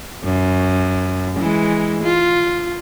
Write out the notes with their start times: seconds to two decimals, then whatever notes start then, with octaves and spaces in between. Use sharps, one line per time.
0.24 F#2
1.39 E3 G#3
2.04 F4